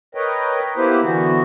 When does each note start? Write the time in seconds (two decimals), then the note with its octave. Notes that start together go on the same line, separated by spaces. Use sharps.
0.15 A#4 B4 C#5 D#5 G5
0.77 A#3 B3 E4 G4 B4 C5
1.03 D3 E3 B3 F#4